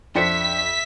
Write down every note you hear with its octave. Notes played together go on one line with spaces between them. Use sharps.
F2 D4 A4 C5 E5 G5 B6 C#7